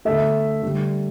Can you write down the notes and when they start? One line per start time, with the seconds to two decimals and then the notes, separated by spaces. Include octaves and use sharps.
0.05 D3 A3 E5
0.62 D3 G3